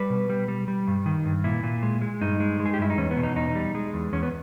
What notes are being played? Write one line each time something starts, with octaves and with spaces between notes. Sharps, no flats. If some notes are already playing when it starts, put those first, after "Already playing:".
Already playing: G3 B4
B2
G3
G3
G3
G2
D#3
G2
A#2 E4
A#2
G#3
G#3
G2 D#4
G#3
G#3
G#4
G4
G2 E4
D#4
E2 C#4
B3
B2
D#4
E2 D#4
G3
G#3
E2
E2 C#4
B3